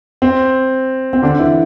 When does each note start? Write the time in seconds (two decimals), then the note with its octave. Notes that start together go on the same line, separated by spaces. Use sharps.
0.22 C4
1.13 C4
1.22 D3 D4
1.39 E3 E4